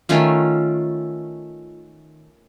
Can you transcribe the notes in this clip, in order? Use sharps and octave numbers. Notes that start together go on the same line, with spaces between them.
D#3 A3 C#4 F4